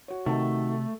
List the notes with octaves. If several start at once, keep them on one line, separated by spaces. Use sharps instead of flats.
F#4 C#5
C3 D#3 A3 F#4 A5